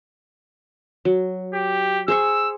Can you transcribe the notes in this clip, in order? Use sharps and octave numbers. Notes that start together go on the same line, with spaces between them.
F#3
G4
G#4 C5 C#6 E6